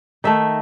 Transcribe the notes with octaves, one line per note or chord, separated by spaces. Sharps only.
D#3 A3 E5